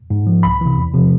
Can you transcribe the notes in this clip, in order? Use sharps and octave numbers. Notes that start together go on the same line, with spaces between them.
G#2
F3
C2 B5
C3 E3
E2
C3 F3